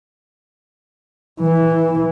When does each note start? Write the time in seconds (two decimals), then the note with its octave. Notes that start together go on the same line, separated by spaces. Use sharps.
1.41 E3